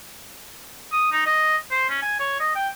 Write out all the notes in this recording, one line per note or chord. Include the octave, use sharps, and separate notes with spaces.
D#6
D#4
D#5
C5
C#4
G#5
C#5
D#5
G5